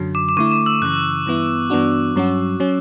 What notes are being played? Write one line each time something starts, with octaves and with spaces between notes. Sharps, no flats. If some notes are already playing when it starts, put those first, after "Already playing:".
Already playing: F#2 D3 F#3
D6
D6
D3 A3 E4 C#6
D6
E6
F#2 C#3 E3 F#6
G2 E3 B3 E4
G2 E3 B3 D4 F#4
G2 F#3 C#4 F#4
F#3 C#4